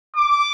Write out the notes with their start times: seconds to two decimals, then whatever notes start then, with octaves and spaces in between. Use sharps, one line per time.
0.17 D6